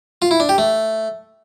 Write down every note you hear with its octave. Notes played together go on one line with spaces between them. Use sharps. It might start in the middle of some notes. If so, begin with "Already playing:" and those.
F4
E4
D4
G4
A3